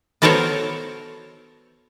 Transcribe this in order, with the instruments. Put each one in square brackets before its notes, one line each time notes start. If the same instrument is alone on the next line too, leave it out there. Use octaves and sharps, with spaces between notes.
[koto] B3 F#4 A4 A#4 C5 C#5